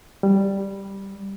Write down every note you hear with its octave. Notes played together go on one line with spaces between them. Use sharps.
G3